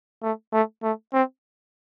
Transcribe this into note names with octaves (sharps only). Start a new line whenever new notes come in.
A3
A3
A3
C4